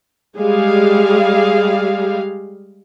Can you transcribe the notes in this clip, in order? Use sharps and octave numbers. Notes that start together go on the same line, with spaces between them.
G3 G#3 G#4 F5